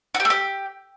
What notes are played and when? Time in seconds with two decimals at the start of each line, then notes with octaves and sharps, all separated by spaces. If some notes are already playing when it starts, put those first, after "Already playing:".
0.15 F#4
0.20 G4
0.25 A3
0.30 G4